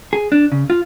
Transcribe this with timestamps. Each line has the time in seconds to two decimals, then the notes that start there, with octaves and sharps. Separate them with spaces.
0.13 G#4
0.32 D4
0.52 C#3
0.70 F4